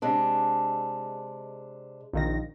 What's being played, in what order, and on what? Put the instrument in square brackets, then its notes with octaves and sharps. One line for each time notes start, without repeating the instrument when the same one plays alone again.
[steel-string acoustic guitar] C3 G#3 D4
[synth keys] A#1 D#3 A#6